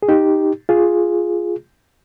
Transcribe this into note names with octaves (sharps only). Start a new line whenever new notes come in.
G#4
D#4 G4
F4 G#4